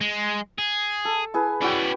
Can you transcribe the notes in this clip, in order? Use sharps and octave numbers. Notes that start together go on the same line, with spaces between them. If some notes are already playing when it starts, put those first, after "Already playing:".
G#3
G#4
A4
E4 G#4 B4
C#4 E4 F#4 D5 G5